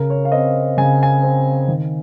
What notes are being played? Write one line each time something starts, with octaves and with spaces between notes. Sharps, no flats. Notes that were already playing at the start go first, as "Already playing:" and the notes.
Already playing: C#3 A#4
C#5
F5
C4 D#5
C#3 G#5
G#5
C4
D#3